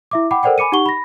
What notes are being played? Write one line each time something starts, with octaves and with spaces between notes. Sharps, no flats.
E4 E5 D6
F#5 G5 B5 D6
A4 A#4 C5 D5 F#5 G5
G#5 B5 D6 C#7 D#7
D#4 G4 F#5 C#6 G7
B5 A#6